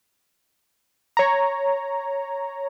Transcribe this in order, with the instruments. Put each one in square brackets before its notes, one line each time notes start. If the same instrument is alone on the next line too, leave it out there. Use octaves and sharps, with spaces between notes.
[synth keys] C#5 A#5